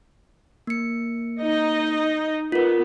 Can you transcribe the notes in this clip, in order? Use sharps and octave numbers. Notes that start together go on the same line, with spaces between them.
A#3 C#7
D#4 D#5
B3 F4 A#4